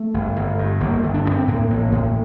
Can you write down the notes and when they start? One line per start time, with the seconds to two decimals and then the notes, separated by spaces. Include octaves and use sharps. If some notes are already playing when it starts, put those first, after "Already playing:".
Already playing: A3
0.14 G1
0.36 G1
0.58 G2
0.81 G1 A#3
1.03 G1
1.14 D4
1.25 G2
1.31 C4
1.47 A2 A#3
1.70 A1
1.92 A2